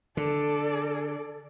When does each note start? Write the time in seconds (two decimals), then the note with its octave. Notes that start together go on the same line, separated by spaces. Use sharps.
0.17 D3 A4 D5